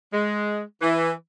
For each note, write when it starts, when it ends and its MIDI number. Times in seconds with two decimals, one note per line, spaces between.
0.13 0.61 56
0.81 1.10 52